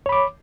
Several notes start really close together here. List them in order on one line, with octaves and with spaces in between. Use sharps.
C#5 B5 D6